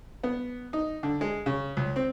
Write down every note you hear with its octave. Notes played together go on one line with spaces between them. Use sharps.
B3
D#4
D3
G#3
C#3
C#2
C4